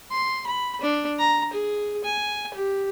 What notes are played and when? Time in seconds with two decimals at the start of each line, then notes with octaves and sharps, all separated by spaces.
0.11 C6
0.46 B5
0.81 D4
1.18 A#5
1.53 G#4
2.04 G#5
2.54 G4